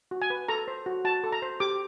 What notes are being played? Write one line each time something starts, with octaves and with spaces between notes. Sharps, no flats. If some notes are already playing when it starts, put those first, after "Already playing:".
F#4
G#5
B4
A4 A#5
C5
F#4
F#4 A5
A4
A#5
C5
G4 D6